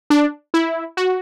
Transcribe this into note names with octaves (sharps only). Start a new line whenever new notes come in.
D4
E4
F#4